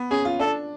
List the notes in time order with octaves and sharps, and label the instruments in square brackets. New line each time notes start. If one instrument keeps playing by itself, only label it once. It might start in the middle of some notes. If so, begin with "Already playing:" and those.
Already playing: [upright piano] B3
[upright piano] C#4 [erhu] G#4
[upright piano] F4
[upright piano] D4 [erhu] A4